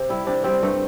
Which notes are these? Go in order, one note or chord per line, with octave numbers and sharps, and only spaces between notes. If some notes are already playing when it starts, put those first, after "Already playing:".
Already playing: C3
G3 E4
C3 D4
G3 C4
G2 A3